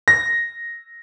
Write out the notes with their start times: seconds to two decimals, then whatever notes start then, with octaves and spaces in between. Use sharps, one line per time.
0.08 A#6